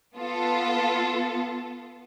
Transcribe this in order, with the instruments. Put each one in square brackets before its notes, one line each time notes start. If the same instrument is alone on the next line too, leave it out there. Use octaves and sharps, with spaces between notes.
[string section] B3 F4 A4